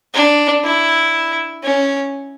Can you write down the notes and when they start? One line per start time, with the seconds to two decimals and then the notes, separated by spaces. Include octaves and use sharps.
0.14 D4
0.64 E4
1.63 C#4